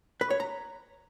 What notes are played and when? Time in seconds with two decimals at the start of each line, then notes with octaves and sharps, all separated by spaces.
0.21 B4
0.30 C#5
0.40 A#5